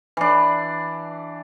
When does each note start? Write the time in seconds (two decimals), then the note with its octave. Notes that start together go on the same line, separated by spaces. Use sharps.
0.17 E3 D4